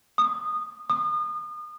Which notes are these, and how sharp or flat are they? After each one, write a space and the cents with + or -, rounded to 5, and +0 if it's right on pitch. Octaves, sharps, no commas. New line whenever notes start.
D#6 -20
D#6 -35